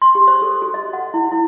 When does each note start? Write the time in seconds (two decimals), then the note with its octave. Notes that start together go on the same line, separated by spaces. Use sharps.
0.02 C6
0.15 G4
0.28 C5
0.42 A4
0.62 F#4
0.74 D#5
0.93 F#5
1.14 E4
1.32 E4